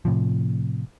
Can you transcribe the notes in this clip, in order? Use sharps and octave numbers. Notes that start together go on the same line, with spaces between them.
A2 C3 F3